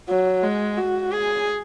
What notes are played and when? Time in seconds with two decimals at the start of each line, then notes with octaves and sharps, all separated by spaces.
0.09 F#3
0.43 G#3
0.78 F#4
1.12 G#4